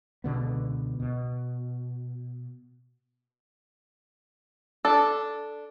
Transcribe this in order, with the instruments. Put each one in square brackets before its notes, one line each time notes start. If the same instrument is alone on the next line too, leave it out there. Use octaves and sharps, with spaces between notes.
[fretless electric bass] C#2 B2 D3 B3
B2
[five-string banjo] D4 A4